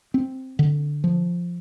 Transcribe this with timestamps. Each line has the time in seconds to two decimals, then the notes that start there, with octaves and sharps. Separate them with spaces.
0.14 C4
0.59 D3
1.04 F3